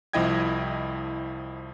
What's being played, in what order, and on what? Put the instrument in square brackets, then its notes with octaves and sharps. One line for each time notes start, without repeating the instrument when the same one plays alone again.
[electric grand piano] C2 F3 E4 D#5 G5 G#6